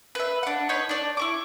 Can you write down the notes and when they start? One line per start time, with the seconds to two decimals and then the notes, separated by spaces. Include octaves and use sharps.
0.15 B4 E5
0.43 D4 F#5
0.69 D#4 B4 C#5
0.89 D4 D5
1.17 E4 C#6 D6